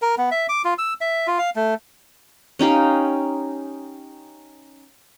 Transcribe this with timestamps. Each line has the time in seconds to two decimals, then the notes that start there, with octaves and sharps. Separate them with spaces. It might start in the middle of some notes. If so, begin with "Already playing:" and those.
0.02 A#4
0.18 B3
0.31 E5
0.49 D6
0.65 F4
0.78 E6
1.01 E5
1.27 F4
1.38 F5
1.56 A3
2.59 C#4 D#4 G4 F5